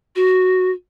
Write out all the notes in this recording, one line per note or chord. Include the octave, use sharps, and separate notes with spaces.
F#4